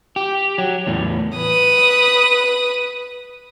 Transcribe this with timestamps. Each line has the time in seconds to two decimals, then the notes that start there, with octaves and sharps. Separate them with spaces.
0.16 G4
0.58 F#3
0.87 E2 A2
1.37 B4 D#6